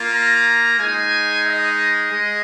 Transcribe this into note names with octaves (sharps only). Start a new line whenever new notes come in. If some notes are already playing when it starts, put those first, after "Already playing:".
Already playing: A#3 F4
A#5
G#3 D#4 G#5
D#5
G#3